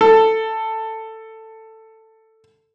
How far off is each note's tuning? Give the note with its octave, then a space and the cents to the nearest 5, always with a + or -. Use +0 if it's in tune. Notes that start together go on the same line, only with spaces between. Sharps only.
A4 +10